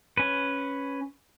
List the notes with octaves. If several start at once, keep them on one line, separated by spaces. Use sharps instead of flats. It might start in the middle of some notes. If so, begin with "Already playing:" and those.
C#4 B4